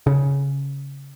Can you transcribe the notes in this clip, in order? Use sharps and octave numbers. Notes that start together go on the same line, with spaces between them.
C#3